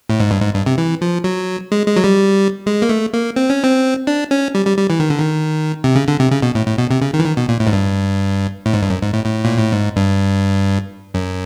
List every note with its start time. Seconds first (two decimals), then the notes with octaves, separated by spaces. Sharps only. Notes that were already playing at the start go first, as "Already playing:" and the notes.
0.10 A2
0.20 G#2
0.31 G2
0.42 G#2
0.55 G2
0.66 C3
0.78 E3
1.02 F3
1.24 F#3
1.72 G#3
1.88 G#3
1.96 F#3
2.04 G3
2.66 G#3
2.82 A#3
2.89 A3
3.13 A#3
3.36 C4
3.50 C#4
3.64 C4
4.07 D4
4.31 C#4
4.55 G3
4.66 G3
4.78 G3
4.90 E3
5.00 D#3
5.10 D3
5.20 D#3
5.84 C3
5.95 C#3
6.08 D3
6.20 C3
6.31 C#3
6.42 B2
6.55 A2
6.67 A2
6.78 B2
6.91 C3
7.02 C#3
7.13 D#3
7.19 E3
7.25 D#3
7.37 B2
7.48 A#2
7.60 A2
7.67 G#2
7.73 G2
8.66 A2
8.73 G#2
8.82 G2
8.90 F#2
9.02 G#2
9.13 A2
9.25 A2
9.45 A#2
9.58 A2
9.72 G#2
9.96 G2
11.14 F#2